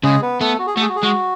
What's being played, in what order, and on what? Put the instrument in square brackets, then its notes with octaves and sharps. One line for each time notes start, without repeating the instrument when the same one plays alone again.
[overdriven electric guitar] C#3 [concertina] G#3 G#4
[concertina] B3 B4
[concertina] A3 A4 [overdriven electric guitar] B3
[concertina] F#4
G#4
F#4
[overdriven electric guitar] A3
[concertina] G#4
F#4
G#4
[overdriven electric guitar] G#3 [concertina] F#4